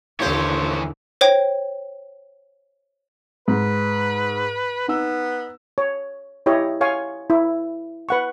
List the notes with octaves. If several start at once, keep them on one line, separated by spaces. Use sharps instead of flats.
D#2 A2 D3 E3 G4 C5 C#5
C5 C#5 G5
G#2 B4
B3 D#4 E6
C#5
E4 G4 C#5 D#5
C#5 F5 G#5 C#6
E4
B4 F#5 C#6